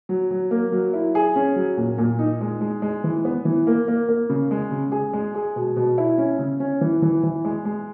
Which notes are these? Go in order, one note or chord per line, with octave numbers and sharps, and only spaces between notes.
F#3
F#3
A#3
F#3
E4
G#4
C#4
F#3
A#2
A#2
D#4
G#3
G#3
G#3
E3
B3
E3
A#3
A#3
A#3
C#3
G#3
C#3
G#4
G#3
G#4
B2
B2
E4
C#4
C#3
C#4
E3
E3
E3
G#3
G#3